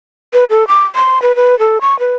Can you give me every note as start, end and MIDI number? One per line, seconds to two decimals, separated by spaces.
0.33 0.44 71
0.50 0.67 69
0.68 0.84 86
0.95 1.21 84
1.22 1.35 71
1.36 1.58 71
1.59 1.78 69
1.81 1.97 85
1.99 2.17 71